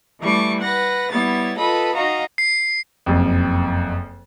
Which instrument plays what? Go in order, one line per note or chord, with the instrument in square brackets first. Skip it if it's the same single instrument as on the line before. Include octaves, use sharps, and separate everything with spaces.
[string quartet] E3 G3 A3 C#6 D6
B4 F#5 A#6
G3 B3 E4 C#5 A6
F4 A4 B4 D#5 B5 D#6
D#4 F#4 D#5 F5 A#5
[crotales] C7
[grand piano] F#1 F2